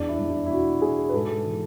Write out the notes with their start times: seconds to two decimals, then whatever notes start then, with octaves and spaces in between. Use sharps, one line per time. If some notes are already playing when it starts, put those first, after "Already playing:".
Already playing: E2 D4
0.08 E4
0.19 E2
0.29 E4
0.46 E4
0.50 B2 F#4
0.82 B2 G#4
1.09 B4
1.14 G#2 A4
1.45 E3